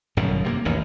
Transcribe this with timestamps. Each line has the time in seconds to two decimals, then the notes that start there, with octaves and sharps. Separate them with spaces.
0.17 G1 F#2 B2 D#3
0.44 C3 G#3 A#3
0.65 A1 D#2 A2 D#3